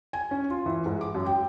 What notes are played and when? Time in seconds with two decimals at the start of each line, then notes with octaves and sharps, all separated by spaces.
0.13 G#5
0.31 C#4
0.50 F4
0.66 E3
0.86 G#2
1.01 D6
1.15 F#2
1.26 G5